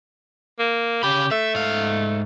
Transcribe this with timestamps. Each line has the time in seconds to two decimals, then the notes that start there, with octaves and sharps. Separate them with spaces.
0.59 A#3
1.03 C#3 G4 B5
1.31 A3 E5
1.55 G#2 F5